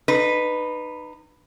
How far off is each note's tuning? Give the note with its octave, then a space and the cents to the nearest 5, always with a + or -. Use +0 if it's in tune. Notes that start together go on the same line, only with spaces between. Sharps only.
D#4 -30 B4 +0